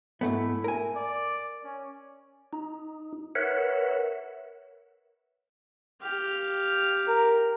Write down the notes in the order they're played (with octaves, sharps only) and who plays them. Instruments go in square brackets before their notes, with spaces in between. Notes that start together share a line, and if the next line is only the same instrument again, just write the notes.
[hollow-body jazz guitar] G#2 A3 B3 [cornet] E4
[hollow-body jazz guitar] A#4 G#5
[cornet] D5
C#4
[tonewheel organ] D#4
A#4 B4 C#5 E5 F#5
[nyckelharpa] G4 F5
[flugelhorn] A#4